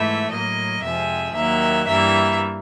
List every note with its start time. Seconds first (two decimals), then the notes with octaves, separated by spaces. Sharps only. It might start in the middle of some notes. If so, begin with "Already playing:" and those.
Already playing: G#2 E3 A3 E5
0.32 A2 F#3 A#3 D#5
0.83 F2 C3 F3 G#3 E5
1.35 D#2 D#3 F#3 A#3 E5
1.86 G2 E3 G3 A#3 E5